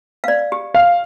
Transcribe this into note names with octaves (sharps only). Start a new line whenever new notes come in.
D5 F5
G4
F5